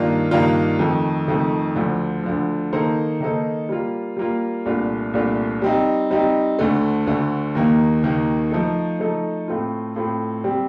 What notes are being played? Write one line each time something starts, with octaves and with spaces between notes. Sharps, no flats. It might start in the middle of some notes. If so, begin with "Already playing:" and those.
Already playing: G2 D#3 A#3 D4 F4
G2 D#3 A#3 D4 F4
F2 D#3 A3
F2 D#3 A3
D2 D3 F3
D2 D3 F3
D#3 A#3 D#4 A4 C5
D#3 A#3 D#4 A4 C5
G3 A#3 F4
G3 A#3 F4
C2 A#2 A3 D4 F4
C2 A#2 A3 D4 F4
G3 C4 D#4
G3 C4 D#4
D2 D3 A3
D2 D3 A3
D#2 D#3 A#3
D#2 D#3 A#3
F3 A3 D#4 A4
F3 A3 D#4 A4
A2 A3 C4 F4
A2 A3 C4 F4
G3 C4 G4